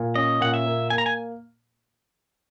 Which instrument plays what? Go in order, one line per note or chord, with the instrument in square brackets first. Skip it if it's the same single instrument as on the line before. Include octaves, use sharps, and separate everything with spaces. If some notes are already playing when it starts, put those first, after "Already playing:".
Already playing: [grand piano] A#2
[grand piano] C#4 [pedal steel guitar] D#5
[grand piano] A#2 [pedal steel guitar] F#5
[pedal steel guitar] E5
[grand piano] A#3
[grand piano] A#3 [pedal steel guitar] G#5
[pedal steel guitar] A#5
G#5